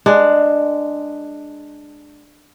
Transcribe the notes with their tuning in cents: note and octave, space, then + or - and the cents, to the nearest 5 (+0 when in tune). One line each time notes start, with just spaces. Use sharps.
G#3 +0 D4 +10